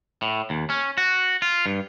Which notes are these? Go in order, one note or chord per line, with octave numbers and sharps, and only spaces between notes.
A2
D#2
C#4
F#4
F4
G2